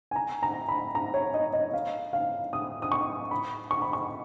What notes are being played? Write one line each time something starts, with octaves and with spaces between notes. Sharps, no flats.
G#5
A#5
A#5
B5
A#5
C#5
D#5
D#5
F5
F5
D#6
D#6
C#6
B5
C#6
B5
C#6